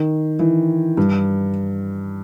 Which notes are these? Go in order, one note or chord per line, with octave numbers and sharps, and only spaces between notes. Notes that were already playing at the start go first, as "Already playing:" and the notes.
Already playing: D#3
E3
G2